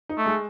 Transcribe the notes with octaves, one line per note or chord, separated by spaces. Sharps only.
D#4
A3
G#3